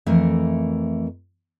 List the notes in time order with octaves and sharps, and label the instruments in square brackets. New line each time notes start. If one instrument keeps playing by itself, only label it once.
[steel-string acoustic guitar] F2 E3 A3 A#4